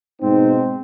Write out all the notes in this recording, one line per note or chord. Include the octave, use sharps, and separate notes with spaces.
G#2 B2 C4 D#4